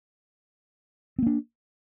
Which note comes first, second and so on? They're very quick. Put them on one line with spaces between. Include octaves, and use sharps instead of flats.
C4 A#3 D4